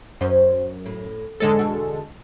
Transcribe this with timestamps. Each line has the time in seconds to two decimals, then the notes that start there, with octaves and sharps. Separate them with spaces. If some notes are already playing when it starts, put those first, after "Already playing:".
0.21 F#2 C#4 C5 D#5
0.86 A2
1.40 F2 G#2 D3 G#3 A4 C#5
1.59 E2 B2 F#4